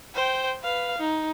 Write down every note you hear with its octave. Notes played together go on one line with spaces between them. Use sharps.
C5 G5
B4 F5
D#4